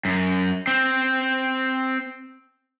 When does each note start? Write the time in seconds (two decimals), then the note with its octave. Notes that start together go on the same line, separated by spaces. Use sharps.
0.05 F#2
0.67 C4